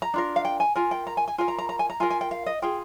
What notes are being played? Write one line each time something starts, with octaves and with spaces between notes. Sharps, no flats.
A#5
D4 F4 A#4
F5
G5
G#5
F4 A#4 G#5
G5
A#5
G#5
G#5
F4 A#4 G#5
A#5
A#5
A#5
G#5
A#5
F4 A#4 G#5
G#5
G5
F5
D#5
F4 G#4 G5